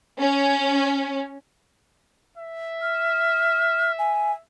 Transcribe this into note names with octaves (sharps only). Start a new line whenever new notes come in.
C#4
E5
F6
G#5